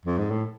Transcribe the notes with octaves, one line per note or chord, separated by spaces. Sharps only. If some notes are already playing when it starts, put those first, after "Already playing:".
F2
G#2
A2